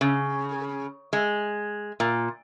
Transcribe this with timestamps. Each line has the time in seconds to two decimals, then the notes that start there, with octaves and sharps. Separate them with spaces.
0.01 C#3
1.13 G#3
2.00 A#2